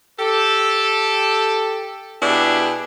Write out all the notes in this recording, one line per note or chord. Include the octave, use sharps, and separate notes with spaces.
G4 A4
B2 D4 E4 G4 G#4